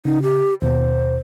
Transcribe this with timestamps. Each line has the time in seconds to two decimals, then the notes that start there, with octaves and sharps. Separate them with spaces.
0.05 C#3 D#4
0.22 G4
0.62 D#2 B2 C5